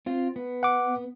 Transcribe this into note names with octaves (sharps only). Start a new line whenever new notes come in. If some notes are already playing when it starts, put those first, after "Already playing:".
C4 F4
B3
F#5 D6